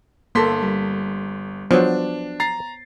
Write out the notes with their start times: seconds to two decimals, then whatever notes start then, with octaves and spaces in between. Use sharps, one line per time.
0.35 G1 A#3 A4 C6 B6
0.62 G3
1.71 F3 F#3 B3 D4 C5 C#5
2.40 A#5 A6 C7